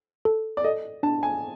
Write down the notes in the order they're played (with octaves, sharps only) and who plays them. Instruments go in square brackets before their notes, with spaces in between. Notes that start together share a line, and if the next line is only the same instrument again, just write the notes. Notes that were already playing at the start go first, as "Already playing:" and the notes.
[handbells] A4
[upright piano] D5
[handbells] A4 [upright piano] D#5
[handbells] D4 [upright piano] A5
[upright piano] G#5